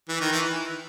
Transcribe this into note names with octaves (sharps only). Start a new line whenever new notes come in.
E3
D#3
E3